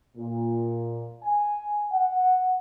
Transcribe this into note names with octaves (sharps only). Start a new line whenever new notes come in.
A#2
G#5
F#5